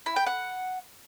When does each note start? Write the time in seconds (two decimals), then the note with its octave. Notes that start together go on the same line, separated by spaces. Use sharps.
0.06 E4
0.16 G5
0.26 F#5